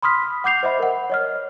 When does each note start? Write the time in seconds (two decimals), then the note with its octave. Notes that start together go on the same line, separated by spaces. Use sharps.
0.02 B5 C6 D#6 F6 B6
0.22 F6
0.44 F#5 D6 G6 C7 F7
0.63 C5 D#5 E5 B5
0.79 A#4 F#5
1.10 C#5 D#5 F6